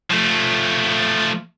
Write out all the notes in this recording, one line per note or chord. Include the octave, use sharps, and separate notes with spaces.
F3 A3